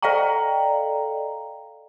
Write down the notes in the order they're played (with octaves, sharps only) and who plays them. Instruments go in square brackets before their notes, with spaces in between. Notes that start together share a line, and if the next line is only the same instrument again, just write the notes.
[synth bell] A4 D5 D#5 F5 G5 A#5